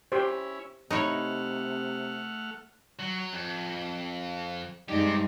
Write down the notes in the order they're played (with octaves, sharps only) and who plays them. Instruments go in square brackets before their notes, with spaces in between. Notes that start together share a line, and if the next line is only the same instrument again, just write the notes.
[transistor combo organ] C#4 E4 [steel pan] G4 C5
[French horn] C3 [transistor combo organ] A3 F#5 F6 [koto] D#4 E4 C#5
[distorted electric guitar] F#3
F2
[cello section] G2 G#3 D#4 [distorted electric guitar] C4 G4